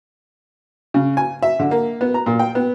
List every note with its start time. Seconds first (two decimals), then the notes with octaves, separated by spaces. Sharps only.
0.94 C#3
1.17 G#5
1.43 E5
1.60 D3
1.71 A#3
2.01 B3
2.14 A#5
2.26 A#2
2.39 G5
2.55 B3